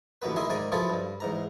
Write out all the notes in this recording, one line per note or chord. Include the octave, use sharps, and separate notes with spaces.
A1 D#2 B2 B3 B4
D#3 E4 G#4 E5 C6
G#2 D#3 D5 G#5
B2 F3 E4 F4 G#4 A4
G2
E2 G#2 A#5